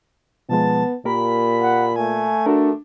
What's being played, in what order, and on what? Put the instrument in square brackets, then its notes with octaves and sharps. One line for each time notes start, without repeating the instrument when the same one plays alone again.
[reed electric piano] B2 F3 G#3 [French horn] B3 [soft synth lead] A5
[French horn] A#2 [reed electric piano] A#3 G4 A#4 [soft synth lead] B5
[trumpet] F#5
[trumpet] A3 [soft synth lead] G#5
[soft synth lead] D4 [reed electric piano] F#4 A4 A#4